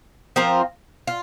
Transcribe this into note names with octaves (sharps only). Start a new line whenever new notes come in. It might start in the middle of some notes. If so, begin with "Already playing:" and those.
F3 C4 F4 A#4
F4